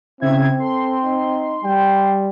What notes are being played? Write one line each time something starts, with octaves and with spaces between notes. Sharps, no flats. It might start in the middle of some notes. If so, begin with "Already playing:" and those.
C#3 C4 E4 E5 G#6
A4 C6
D#4
G3 G5